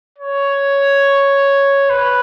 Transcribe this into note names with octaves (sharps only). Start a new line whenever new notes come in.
C#5
B4